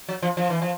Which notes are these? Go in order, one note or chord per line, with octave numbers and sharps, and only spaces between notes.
F#3
F3
F3
E3
F3